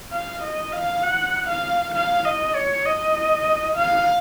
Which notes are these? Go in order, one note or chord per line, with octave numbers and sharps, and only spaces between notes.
F5
D#5
F5
F#5
F5
F5
D#5
C#5
D#5
F5